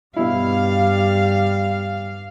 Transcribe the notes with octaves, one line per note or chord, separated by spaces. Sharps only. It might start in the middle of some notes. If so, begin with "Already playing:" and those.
G2 B2 G3 E4 F5